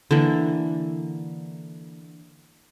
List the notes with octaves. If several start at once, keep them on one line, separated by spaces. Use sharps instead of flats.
D3 E3 A#3